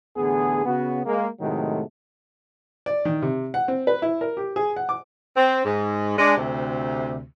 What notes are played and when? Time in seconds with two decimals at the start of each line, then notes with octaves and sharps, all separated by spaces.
0.16 A1 D3 B3 G#4
0.65 C#3 B3 F#4
1.06 G#3 A#3
1.40 A2 C3 D#3 F#3 G#3 A3
2.86 D5
3.05 D#3
3.22 C3
3.54 F#5
3.68 C4
3.87 B4
4.02 E4
4.21 A#4
4.37 G4
4.56 G#4
4.76 F#5
4.89 D6
5.36 C4
5.65 G#2
6.17 G#3 D4
6.36 D2 C3